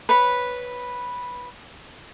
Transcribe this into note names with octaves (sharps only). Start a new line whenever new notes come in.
B4 C#5 B5